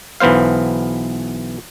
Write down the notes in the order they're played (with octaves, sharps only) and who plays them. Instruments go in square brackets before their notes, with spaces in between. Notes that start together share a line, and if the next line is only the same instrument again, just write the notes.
[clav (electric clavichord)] B1 E3 B3 C5 F5